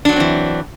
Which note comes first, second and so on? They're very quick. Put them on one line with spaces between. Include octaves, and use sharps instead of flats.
D4 F#3 B3 C4 E3